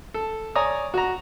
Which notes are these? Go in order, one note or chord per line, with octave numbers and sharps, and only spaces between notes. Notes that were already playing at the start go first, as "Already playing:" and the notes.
A4
C#5 D5 G#5 A#5 D#6
F#4 A#5